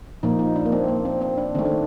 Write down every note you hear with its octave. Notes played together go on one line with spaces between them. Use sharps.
A#2 F3 A#3 D#4
D#4
D4
A#3
C4
A#3
C4
C4
D4
D#3 A3 C4
D4